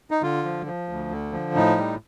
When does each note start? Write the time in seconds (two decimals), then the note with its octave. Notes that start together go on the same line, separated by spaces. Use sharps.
0.11 D#4
0.22 D3 F4
0.44 F3
0.66 F3
0.89 D2
1.11 D3
1.32 F3
1.55 A2 D#4
1.78 G3